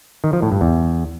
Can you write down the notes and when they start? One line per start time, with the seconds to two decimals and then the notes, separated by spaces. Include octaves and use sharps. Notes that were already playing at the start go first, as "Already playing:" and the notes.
0.24 D#3
0.33 F3
0.42 A2
0.52 G2
0.61 E2